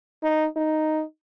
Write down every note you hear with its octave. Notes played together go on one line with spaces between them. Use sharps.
D#4
D#4